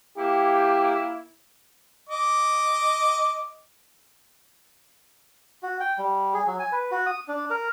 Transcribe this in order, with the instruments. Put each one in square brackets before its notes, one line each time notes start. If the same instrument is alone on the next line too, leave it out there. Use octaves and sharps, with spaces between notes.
[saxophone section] A#3 E4 [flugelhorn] G4
[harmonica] D#5 D6
[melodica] F#4
G5
G3
G#4
F#3
G#5
B4
F#4
D#6
D4
A#4